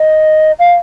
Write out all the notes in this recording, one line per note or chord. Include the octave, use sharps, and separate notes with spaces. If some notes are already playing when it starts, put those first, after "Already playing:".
Already playing: D#5
F5